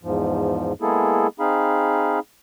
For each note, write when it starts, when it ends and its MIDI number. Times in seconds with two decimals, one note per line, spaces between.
0.03 0.73 40
0.03 0.73 44
0.03 0.73 53
0.82 1.27 56
0.82 1.27 58
0.82 1.27 59
0.82 1.27 64
0.82 1.27 68
0.82 1.27 69
1.40 2.19 60
1.40 2.19 63
1.40 2.19 68
1.40 2.19 77
1.40 2.19 83